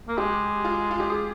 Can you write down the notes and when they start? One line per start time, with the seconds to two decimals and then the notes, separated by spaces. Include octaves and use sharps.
0.08 A#3
0.18 G#3 G4
0.65 F4
0.91 F4
1.00 G4
1.10 G#4